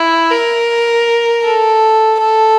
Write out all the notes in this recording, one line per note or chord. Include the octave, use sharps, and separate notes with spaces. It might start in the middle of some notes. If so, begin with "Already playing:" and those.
Already playing: E4
A#4
A4
A4